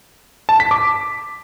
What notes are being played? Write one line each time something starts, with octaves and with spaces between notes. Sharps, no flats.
A5
B6
D6